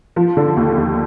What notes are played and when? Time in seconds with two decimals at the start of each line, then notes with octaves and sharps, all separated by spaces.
0.16 F3
0.37 D3
0.57 D#2
0.78 D#2